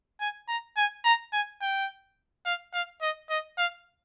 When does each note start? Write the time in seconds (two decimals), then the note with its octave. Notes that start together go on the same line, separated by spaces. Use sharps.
0.21 G#5
0.48 A#5
0.77 G#5
1.04 A#5
1.33 G#5
1.61 G5
2.45 F5
2.73 F5
3.01 D#5
3.30 D#5
3.58 F5